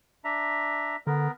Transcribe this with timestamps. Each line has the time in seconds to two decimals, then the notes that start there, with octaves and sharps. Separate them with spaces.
0.24 D4 E5 A#5
1.07 D3 B3 A#4